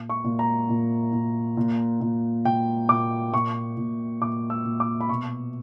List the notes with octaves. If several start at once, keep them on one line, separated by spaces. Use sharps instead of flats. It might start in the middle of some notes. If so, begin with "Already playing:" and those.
Already playing: A#2
C#6
A#2
A#5
A#2
A#2
A#2
A#2
A#2 G5
A#2 D6
A#2 C#6
A#2
A#2 D6
E6
A#2
D6
B5
B2 C#6